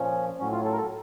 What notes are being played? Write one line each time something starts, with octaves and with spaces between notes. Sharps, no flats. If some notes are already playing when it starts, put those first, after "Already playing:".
Already playing: A#2 F3 C#4
A2 F#3 C#4
F4
A4
A#4
A4